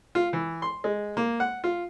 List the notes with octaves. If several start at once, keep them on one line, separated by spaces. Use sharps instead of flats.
F4
E3
C6
G#3
A#3
F#5
F4